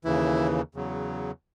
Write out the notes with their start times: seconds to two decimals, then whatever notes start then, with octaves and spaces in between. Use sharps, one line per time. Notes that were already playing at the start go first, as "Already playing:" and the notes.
0.05 D#2 C#3 E3 E4
0.75 E2 C#3 F#3